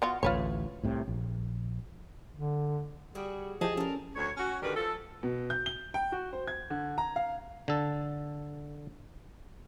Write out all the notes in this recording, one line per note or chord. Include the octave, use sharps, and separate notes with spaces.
B3 F4 F#4
A1 D2 A2 F4 B4 C#5
C2 A2 C3
A#1
D3
G3 F#4 G#4
F3 E4 G4 G#4 D#5 G#5 A5
C#4 A4 A#4
D2 C#5
C#4 F#4
D3 D#3 G3 A#4 B4
F3 A4
B2
G6
G7
G5
F#4
C5
G#6
D3
A#5
F5
D3 A4